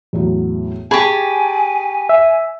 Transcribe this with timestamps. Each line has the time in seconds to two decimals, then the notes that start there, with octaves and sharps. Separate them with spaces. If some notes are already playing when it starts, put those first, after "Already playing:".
0.13 E2 A2 F#3
0.91 G4 G#4 G#5 A5 B5 C#6
2.09 E5